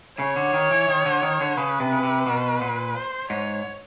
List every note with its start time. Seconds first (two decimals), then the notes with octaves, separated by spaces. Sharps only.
0.19 C#3 C#5
0.36 D3
0.54 D#3
0.71 E3
0.88 D#3
1.06 D3
1.23 D#3
1.41 D3
1.57 C#3 B4
1.80 C3
1.92 C#3
2.03 C3
2.26 B2
2.61 A#2
2.95 C5
3.30 G#2 C#5